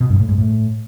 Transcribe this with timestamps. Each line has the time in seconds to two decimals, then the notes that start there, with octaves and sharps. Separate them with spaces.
0.01 B2
0.10 G2
0.19 A2
0.29 G#2
0.38 A2